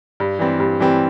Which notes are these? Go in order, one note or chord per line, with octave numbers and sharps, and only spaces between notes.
G2
E3 G3 C4
G2
E3 G3 C4